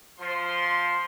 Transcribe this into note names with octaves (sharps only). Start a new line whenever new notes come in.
F3 C6